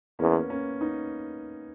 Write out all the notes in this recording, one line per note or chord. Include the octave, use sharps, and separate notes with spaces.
E2 A#3 C#4
B3
A#3 C#4
B3 D#4